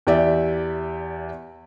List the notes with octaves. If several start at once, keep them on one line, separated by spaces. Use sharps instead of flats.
E2 G4 D5 E5